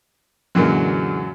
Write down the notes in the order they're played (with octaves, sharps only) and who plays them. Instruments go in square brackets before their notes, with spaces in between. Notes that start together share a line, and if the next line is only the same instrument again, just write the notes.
[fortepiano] F#2 A#2 F#3 [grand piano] D3 E3 G#3